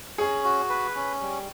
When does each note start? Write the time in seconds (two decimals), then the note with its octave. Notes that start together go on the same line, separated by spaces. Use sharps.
0.18 C#4 G#4
0.44 F#4
0.70 B4
0.96 C#4
1.21 G3